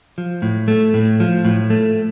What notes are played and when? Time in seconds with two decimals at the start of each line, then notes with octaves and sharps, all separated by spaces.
0.18 F3
0.42 A2
0.68 A3
0.94 A2
1.20 F3
1.45 A2
1.70 A3